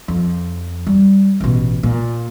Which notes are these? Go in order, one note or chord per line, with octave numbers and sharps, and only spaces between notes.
F2
G3
A1 B2
A#2